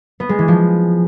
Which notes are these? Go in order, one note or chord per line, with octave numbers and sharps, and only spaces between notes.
B3
G#3
E3
F3